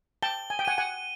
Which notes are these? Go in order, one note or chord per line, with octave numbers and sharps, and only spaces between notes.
G5 A5 G7
G#5
G5
F#5 G#5 D#7
F#5 G#5